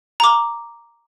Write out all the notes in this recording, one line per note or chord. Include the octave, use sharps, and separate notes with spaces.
A#5 D6